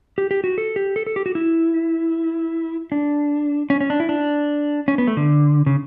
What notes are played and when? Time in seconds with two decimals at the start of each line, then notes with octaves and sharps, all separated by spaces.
0.18 G4
0.31 G4
0.44 F#4
0.58 A4
0.76 G4
0.96 A4
1.07 A4
1.16 G4
1.26 F#4
1.35 E4
2.92 D4
3.70 C#4
3.80 C#4
3.90 D4
4.00 E4
4.09 D4
4.88 C#4
4.98 B3
5.07 A3
5.17 D3
5.66 C#3